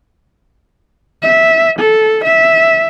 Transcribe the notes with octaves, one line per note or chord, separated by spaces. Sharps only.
E5
A4
E5